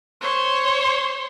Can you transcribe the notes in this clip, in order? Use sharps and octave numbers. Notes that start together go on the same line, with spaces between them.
C5 C#5